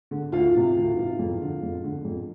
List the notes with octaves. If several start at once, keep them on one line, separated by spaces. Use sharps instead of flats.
D3
D2 F4 F5
C3 E3
D2
C3 E3
F2
D3
F2
D3
F2